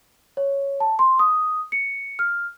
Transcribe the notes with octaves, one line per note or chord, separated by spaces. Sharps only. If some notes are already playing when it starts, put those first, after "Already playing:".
C#5
A5
C6
D#6
C#7
F6